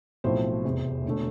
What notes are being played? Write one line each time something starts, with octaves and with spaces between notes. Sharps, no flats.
B1 A2 F3 C4 C5
F1 E2 C3
E1 D3 A3